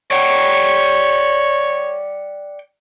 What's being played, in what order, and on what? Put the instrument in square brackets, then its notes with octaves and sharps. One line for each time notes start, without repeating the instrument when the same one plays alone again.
[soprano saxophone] C#5 [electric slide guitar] D5 F#5 G5